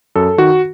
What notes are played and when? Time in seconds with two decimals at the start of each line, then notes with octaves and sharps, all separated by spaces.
0.16 F#2 A4
0.38 D#3 F#4